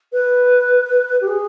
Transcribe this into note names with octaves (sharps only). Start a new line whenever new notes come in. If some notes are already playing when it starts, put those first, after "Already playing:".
B4
G4
G#4